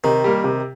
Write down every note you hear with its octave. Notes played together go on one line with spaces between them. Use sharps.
C3 D#3
G3 A#3
C3